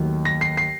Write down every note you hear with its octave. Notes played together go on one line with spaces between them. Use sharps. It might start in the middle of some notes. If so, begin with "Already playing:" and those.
Already playing: D#2 D#3 F#3 A3
A#6
C7
C7